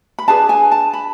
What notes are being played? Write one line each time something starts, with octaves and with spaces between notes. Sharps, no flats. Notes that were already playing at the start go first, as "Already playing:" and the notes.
B5
D4 G#4 B4 A5
G#5
A5
B5